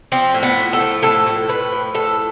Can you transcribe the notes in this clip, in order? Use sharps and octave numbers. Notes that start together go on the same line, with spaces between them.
F3 C4
A2
B3
A2
A4
F3
A2 A4
A2
A2 B4
F3
A2 A4